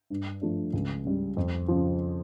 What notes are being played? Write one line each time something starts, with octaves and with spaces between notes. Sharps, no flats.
G2
F3 A3 D4
C#2
C#3 G3
F2
C#3 F3